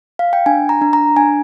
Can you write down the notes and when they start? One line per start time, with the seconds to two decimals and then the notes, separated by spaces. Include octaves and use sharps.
0.19 F5
0.33 G5
0.46 D4 G#5
0.69 A#5
0.82 D4
0.93 A#5
1.16 D4 G#5